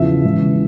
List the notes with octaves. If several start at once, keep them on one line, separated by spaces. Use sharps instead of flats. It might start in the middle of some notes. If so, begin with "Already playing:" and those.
Already playing: E2 C#3 F3 E5
E1 E2 C#3 E3